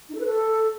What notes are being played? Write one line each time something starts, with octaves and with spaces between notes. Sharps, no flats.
D#4
A4
B4
A4